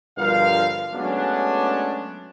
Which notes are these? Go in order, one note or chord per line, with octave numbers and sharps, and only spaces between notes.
G2 B2 D3 F3 A#4 F5
F#3 G#3 A3 B3 C#4 D4